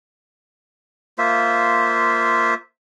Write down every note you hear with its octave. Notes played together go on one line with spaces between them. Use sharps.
A#3 F4 C5 E5